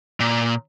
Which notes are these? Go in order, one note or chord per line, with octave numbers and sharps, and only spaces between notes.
A#2